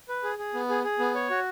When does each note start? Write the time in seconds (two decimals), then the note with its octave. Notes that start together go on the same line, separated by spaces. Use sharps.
0.09 B4
0.24 G#4
0.39 G#4
0.54 B3
0.69 G#4
0.84 G#4
0.99 B3
1.15 C#5
1.30 F#4